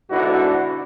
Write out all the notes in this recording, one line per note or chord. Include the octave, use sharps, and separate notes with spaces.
G#2 B2 D3 D4 E4 F#4